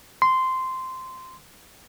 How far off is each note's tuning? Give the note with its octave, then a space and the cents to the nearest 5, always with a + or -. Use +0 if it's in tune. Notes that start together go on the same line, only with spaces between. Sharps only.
C6 -10